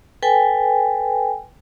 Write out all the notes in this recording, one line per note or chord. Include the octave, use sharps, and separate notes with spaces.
A4 B4 G5 G#5